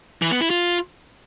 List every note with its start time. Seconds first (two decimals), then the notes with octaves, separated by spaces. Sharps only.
0.22 E3
0.31 B3
0.41 E4
0.50 F4